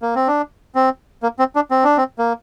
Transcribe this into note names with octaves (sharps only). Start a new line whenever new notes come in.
A#3
C4
D4
C4
A#3
C4
D4
C4
D4
C4
A#3